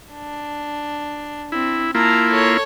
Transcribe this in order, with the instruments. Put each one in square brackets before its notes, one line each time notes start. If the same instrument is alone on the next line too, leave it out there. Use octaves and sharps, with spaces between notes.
[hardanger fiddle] D4
[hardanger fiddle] C4 [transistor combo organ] E4
[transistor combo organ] A#3 E4 F4 [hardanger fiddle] A5 A#5
[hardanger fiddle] A4 C#5